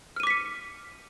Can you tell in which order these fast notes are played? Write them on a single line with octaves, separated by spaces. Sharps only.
F6 D#7 D6 B6 C#7